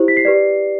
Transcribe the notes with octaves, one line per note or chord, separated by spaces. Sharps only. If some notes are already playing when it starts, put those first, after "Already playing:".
Already playing: E4 G4 C5
B6
C7
G4 B4 D5